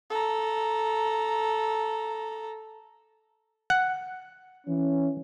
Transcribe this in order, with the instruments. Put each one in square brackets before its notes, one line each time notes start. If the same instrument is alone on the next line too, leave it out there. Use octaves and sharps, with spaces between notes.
[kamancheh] A4 A#5
[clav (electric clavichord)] F#5
[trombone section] E3 C#4